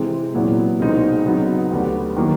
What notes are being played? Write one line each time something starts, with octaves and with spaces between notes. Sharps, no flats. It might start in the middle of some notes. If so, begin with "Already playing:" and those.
Already playing: C3 E3 G#3 C4
A#2 F#3 B3 E4
C2 B2 G#3 C4 D#4
C#3 F#3 B3 D#4
D2 D3 G3 B3
D#3 F#3 A#3